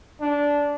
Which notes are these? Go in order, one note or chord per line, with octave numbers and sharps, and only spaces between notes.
D4